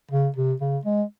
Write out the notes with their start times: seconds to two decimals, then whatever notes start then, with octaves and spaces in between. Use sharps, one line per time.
0.12 C#3
0.36 C3
0.61 C#3
0.85 G#3